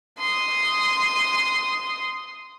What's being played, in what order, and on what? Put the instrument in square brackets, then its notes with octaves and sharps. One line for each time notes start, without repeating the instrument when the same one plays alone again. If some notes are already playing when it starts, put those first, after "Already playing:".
[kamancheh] C6 D#6